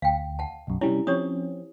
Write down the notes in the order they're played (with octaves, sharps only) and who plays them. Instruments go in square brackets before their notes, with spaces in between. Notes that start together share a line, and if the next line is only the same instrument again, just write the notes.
[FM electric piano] D2 [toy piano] F5 G5
[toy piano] F#5 A5
[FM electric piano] B1 F#2
[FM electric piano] C3 G3 C#4 [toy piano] E4
[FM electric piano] F3 C4 C#4 [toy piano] G4 C#5 D#6